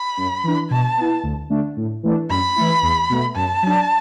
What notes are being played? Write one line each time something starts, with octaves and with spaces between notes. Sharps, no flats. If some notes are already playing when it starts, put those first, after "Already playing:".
Already playing: B5
F#2
E3 D4
B2 A5
B3 E4
D2
D3 A3 D4
A2
E3 A3 D4
F#2 B5
E3 A3 E4
E2
B2 A3
F#2 A5
F#3 D4